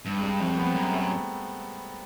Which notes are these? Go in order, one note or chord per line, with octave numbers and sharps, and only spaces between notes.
G2
G#3
G3
F2 A3
C4
B3
F#2 A#3
A3